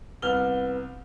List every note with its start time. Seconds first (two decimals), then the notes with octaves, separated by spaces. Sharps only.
0.22 C2 B3 F6 G7